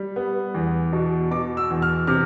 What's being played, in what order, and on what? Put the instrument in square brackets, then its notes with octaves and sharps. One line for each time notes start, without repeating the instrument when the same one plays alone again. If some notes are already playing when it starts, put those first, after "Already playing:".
Already playing: [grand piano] G3
B3
E2
B2
B2 D6
E6
E2
F6
C3 F6